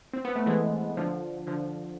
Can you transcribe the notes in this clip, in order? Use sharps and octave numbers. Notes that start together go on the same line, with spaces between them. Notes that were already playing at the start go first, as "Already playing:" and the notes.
C4
B3
A3
E3 G#3
D3 F3
D3 F3